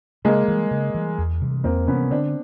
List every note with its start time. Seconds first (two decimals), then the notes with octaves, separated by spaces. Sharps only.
0.25 C#3 G#3 A#3
0.48 E3 G3
0.71 C#3
0.94 E3 G3
1.18 E2
1.41 C3 E3 G3
1.64 E2 A#3 C4
1.87 C3 E3 G3 B3 C#4
2.10 D3 C4 D4